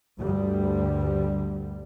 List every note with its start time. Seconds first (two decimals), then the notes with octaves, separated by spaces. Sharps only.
0.18 D2 G2 D3 G3